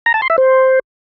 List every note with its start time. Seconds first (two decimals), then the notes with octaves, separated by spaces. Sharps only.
0.06 A#5
0.14 A5
0.22 C6
0.30 E5
0.38 C5